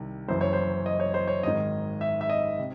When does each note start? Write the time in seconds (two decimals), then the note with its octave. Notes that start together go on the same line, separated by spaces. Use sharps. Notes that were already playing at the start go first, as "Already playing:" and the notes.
Already playing: C2 C3 D#3
0.28 F#1 F#2 E3 C5
0.41 C#5
0.53 C5
0.86 D#5
1.00 C#5
1.14 C5
1.28 C#5
1.43 G#1 G#2 D#3 D#5
2.01 E5
2.21 E5
2.30 D#5
2.59 C3